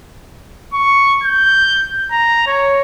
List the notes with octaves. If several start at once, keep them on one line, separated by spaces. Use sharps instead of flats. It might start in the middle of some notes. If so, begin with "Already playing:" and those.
C#6
G6
A#5
C#5